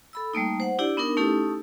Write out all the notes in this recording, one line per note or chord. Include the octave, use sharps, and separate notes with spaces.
A4 B5 E6
G3 A3 A#3 D#4
C5 F#5
D4 E4 G4 D5
B3 D4 D#4 A#4
A3 C#4 D#4 E4 G4 A4